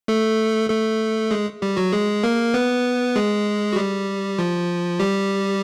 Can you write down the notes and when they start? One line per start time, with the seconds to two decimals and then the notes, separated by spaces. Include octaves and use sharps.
0.08 A3 A4
0.70 A3 A4
1.31 G#3 G#4
1.62 G3 G4
1.77 F#3 F#4
1.93 G#3 G#4
2.23 A#3 A#4
2.54 B3 B4
3.16 G#3 G#4
3.73 F#4
3.76 G3 G4
4.39 F3 F4
5.00 G3 G4